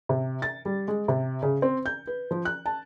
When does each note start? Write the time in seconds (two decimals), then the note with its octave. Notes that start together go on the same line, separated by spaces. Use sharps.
0.09 C3
0.42 A6
0.65 G3
0.88 G#3
1.08 C3
1.43 C#3
1.62 C4
1.86 G6
2.07 B4
2.31 F3
2.45 F#6
2.66 A5